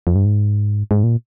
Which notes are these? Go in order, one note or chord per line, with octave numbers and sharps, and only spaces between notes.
F2
G2
G#2
G#2
A#2